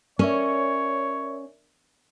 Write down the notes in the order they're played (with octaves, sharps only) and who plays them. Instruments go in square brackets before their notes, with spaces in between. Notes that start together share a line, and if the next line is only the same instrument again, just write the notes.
[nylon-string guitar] C#4 [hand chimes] A#4 D5 E5 [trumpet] C#5